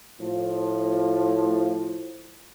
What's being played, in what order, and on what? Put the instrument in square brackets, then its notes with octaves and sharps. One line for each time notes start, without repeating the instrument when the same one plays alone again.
[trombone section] A2 F3